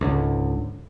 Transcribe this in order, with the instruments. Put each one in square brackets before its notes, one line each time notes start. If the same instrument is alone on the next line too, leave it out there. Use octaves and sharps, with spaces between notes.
[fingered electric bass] C#2 G#2 D3